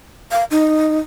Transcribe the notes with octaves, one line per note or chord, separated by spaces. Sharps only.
F5
D#4